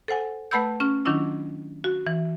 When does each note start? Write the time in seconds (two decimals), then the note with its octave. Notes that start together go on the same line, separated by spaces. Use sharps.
0.08 A4 C5 F#5 G#5
0.51 A3 B4 F#5 B5 E6 G6
0.80 C#4 F6
1.05 D#3 F#3 C#4 D4 E4 F4
1.84 F#4
2.07 E3